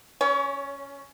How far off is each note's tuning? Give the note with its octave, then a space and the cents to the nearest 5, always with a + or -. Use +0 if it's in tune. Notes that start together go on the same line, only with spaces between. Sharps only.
C#4 +0 C#5 +30